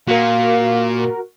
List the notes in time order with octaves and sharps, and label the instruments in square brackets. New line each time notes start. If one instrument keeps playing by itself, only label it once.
[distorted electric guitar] A#2 [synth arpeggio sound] F#4 A#4 [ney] F5